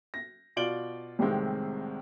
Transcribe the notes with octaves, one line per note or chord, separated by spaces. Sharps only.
A#6
B2 F4 D5 D7 F#7 G7
C2 A2 C3 D#3 G#3 C4